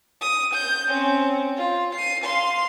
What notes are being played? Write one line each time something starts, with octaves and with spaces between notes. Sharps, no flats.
D#6
G6
C4 C#4
F4
C7 D#7
F5 C6